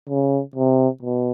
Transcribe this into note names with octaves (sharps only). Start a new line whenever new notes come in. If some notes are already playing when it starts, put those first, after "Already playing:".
C#3
C3
B2